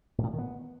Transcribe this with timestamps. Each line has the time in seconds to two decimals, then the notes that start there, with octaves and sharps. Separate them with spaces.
0.18 A#2
0.23 A2
0.28 D3
0.33 D#3
0.38 B3